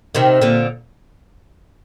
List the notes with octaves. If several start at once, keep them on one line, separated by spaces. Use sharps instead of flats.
C3 D#3
A#2 D3